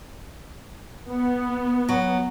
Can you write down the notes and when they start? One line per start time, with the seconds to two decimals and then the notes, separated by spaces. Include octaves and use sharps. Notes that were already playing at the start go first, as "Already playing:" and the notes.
1.09 B3
1.89 F#3